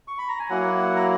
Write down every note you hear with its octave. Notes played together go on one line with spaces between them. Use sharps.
C#6
B5
A#5
G#5
F#3 A#3 E4 F#5
F#5
A#5